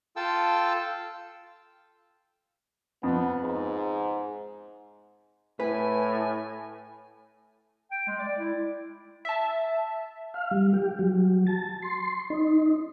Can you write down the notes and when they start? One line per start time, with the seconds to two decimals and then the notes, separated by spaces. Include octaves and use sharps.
0.16 F4 A4 G5 A5 E6
3.03 F2 B3
3.41 G#2
5.60 A2 B4 G#5
7.91 G5
8.07 G#3
8.19 D5
8.39 E4
9.25 E5 A5
10.34 F5
10.51 G3
10.73 G4
10.99 F#3
11.47 A5
11.82 C6
12.30 D#4